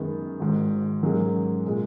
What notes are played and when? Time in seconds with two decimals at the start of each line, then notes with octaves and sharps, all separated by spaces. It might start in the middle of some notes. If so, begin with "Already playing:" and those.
Already playing: F#2 D#3 G#3 B3
0.40 G#1 G#2 D#3
1.03 G#2 F#3 A#3 C#4 G#4
1.66 A#2 G#3